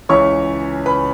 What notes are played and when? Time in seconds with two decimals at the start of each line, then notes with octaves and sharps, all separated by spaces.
0.09 C#2 C#3 E3 C#5 C#6
0.86 B4 B5